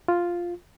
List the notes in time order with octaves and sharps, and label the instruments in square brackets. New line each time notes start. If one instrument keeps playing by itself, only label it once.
[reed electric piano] F4